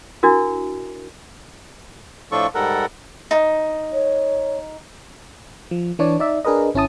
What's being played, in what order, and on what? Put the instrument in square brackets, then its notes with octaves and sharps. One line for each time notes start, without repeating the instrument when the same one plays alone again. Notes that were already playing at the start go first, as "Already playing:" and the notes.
[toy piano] D4 E4 F#4 A#4
[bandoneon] A2 F3 D4 F4 A4 C#6
G#2 G3 A4 A#4 F#5
[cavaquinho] D#4
[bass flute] C#5
[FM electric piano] F3
E3 D4 C#5 D5
D#4 D5 E5
D4 G#4 A#4 B4 D#5
G#1 C#4 E4 A5 D#6